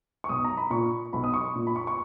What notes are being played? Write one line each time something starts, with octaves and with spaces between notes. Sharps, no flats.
C#6
B1 D#6
A#5
B5
A#2 C#6
B1 B5
D#6
C#6
A#2
B5
C#6
C#6